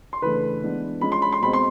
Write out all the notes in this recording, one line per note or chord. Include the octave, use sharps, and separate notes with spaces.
C6
C#3 E3 A3 D4 B4 B5
E3 G#3 B3 D4
F3 G#3 C#4 B5
C6
B5
C6
B2 G#3 C4 B5
C6